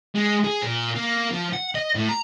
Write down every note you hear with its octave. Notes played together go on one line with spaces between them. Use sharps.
G#3
G#4
A#2
A#3
F3
F#5
D#5
A2
A#5